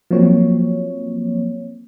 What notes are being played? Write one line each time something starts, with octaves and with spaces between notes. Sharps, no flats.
F3 F#3 A#3 C4 C#5